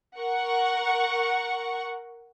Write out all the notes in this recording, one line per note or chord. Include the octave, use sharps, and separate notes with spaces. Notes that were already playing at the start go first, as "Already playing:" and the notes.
A#4 F#5 C#6